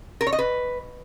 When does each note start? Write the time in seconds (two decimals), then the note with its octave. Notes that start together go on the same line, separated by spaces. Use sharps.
0.21 A#4
0.27 C#5
0.33 D#5
0.39 B4